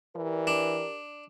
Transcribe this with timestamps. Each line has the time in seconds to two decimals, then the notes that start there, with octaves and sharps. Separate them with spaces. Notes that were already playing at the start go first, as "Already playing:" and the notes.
0.16 E3 G4 A#4 D5
0.47 D4